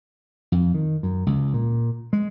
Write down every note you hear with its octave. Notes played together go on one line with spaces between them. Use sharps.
F2
D#3
F#2
C#2
A#2
G#3